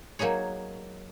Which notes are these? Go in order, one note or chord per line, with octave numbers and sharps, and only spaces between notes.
F#3 A#3 D#4 G#4 C#5